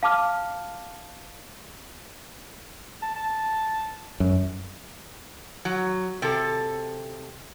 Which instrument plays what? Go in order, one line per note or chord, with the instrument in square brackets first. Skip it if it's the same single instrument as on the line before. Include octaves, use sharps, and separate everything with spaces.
[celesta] F5 A5 D6 F6
[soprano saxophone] A5
A5
[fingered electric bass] F#2
[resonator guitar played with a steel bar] F#3
C3 A4